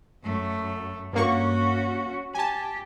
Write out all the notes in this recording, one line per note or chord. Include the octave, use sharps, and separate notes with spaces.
F#2 A3
G2 A#3 C#4 F#4 C#6
G4 G#5 A5